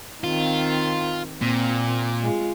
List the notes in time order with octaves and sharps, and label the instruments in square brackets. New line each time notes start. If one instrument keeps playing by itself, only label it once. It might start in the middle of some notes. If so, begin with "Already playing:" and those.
[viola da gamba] D#3 C4 [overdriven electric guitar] F4
[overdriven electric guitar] A#2 [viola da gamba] C4
[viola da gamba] G#3 F4